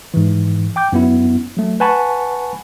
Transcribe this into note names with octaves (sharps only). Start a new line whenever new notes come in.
G#2 E3
G5 D6 G6
F#2 B3 E4
F#3 A3
B4 F#5 G#5 A5 B5 C#6